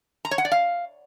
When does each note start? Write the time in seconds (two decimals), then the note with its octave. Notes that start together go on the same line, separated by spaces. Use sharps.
0.25 A#5
0.31 C#5
0.38 F#5
0.45 D5
0.52 F5